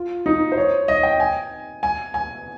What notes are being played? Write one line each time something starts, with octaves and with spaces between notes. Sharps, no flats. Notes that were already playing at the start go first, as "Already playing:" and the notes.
Already playing: F4
D#4
C5
C#5
D#5
G5
G#5
G#5
G#5